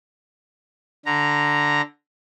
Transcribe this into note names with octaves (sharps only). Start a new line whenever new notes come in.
D3 A#5